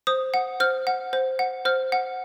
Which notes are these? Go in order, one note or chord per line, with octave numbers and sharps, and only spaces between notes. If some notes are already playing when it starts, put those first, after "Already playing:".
C5 D#6
F#5
C5 F6
F#5
C5
F#5
C5 F6
F#5